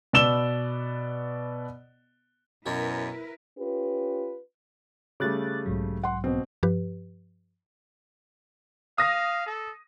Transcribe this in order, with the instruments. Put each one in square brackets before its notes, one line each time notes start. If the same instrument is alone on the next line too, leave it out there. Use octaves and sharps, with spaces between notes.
[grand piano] B2 B3 D5 E6 E7 G7
[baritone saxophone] F#2 [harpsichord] B2 C#4 [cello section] E4 A#4 B4
[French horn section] C#4 F4 G4 B4
[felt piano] C#3 G3 A3 [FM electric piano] D6 F#6 A6
[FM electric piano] B1 G#2 F#3
[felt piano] F#5 C6
B2 C4
[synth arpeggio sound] G2 F3 G4 B4
[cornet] F5 [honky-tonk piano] D#6 A#6
[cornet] A4